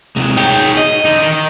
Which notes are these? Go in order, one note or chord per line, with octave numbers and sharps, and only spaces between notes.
C3 G#3
D#4 G#4 C#5 G5
D#5
D3 D#4
D#3